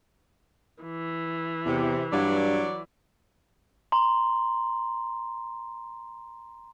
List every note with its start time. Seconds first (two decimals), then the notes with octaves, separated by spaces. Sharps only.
0.83 E3
1.65 E2 C3
2.12 G2 F#3 D5
3.92 A#5 C6